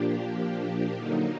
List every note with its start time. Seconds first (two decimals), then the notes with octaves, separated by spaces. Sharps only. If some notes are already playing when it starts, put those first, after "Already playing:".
Already playing: A#2 F3 A#3 D4 G4
0.95 D3 F#3 A#3 D#4